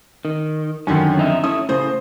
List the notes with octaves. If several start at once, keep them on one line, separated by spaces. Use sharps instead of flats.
D#3
F#2 D3 D#3 C#4
F2 D#4 E5
A3 C#4 E4 D#6
A2 C#3 C5